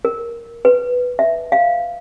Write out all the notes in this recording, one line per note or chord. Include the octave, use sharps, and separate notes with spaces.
A#4
B4
E5
F5